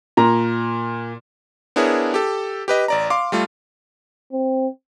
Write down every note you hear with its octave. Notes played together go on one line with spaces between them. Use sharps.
A#2 A#5
B3 D4 E4 G#4 A#4 C#5
G4 A4
G4 B4 D#5
A1 D5 A#5
F5 C6 D6
G3 A3 F4
C4